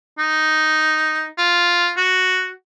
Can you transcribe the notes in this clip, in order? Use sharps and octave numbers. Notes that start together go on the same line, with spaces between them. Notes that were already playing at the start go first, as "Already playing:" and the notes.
D#4
F4
F#4